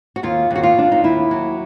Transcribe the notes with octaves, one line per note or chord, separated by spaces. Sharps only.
F#4
D#2 F4
D#2 F#4
F4
D#2 D4
D#4
D#2 E4
F#3